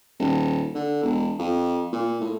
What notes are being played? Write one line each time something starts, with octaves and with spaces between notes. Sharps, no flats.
D#1
D3
E1
F2
A#2
A2